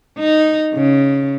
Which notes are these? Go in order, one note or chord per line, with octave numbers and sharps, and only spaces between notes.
D#4
C#3